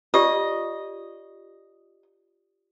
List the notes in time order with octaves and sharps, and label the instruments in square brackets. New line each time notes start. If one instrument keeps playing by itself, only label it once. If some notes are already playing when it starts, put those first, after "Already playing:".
[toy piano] F4 G4 D5 [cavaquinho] D#5